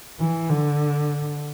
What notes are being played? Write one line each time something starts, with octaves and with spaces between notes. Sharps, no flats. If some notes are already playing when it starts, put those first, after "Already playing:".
E3
D3